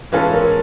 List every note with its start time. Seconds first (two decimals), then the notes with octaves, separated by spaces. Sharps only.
0.12 E3 G#3 C#4 F4 A4 B4
0.34 A#4